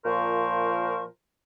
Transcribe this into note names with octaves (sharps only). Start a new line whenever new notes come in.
A#2 F3 A#4 C5 C#6